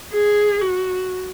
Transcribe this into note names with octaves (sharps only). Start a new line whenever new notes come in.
G#4
F#4